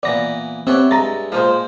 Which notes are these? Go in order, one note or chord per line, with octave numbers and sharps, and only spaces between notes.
A#2 E3 B3 D5 A#6
B3 C4 G4 C#5 D5 E5
G2 G#3 A#5 A6
A#2 F3 G#3 A#4 C5